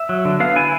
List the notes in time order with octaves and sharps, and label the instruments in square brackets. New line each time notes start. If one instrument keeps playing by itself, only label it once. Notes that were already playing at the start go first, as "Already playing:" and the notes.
Already playing: [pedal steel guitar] E5
F#3
D3
B3 F5
E4 G#5